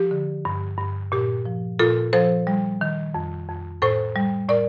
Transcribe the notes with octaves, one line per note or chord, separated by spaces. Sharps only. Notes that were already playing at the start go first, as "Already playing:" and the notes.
Already playing: F3 G4
D3
G2
G2
A#2 G4
F3
A#2 F4 A4
F3 A4 C5
G3
D#3
F2
F2
A2 A4 C5
G3
A2 A#4 D5